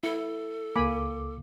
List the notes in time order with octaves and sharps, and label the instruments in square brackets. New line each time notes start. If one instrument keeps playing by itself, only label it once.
[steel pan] E4 [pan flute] A4
[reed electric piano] C#2 D6 [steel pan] A#3 G#5 B5